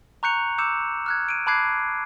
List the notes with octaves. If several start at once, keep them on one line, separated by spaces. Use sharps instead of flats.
A#5 C#6 F#6 G6 C#7 F7
D6 E6 G6 C#7 E7
F6 F#6 G#6
D7 D#7
A5 B5 D6 F#6 G#6 C7